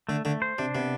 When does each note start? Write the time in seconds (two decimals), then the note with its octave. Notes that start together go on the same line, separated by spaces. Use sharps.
0.09 D3 A3
0.25 D3 A3
0.42 C5
0.58 C3 D4
0.75 C3 B3